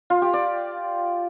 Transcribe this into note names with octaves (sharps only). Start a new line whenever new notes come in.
F4
G4
D5